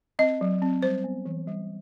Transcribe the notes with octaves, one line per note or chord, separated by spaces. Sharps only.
C4 D#5
F#3
C4
G3 C5
B3
E3
G3